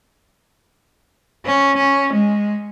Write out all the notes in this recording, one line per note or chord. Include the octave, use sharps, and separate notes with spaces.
C#4
C#4
G#3